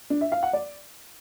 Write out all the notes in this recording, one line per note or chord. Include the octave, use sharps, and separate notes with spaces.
D4
E5
F5
F#5
D5